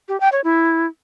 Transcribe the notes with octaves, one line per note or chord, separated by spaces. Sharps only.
G4
G5
C#5
E4